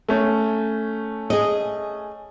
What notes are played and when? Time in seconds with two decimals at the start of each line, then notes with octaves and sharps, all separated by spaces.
0.08 A3 C#4
1.30 G#4 D#5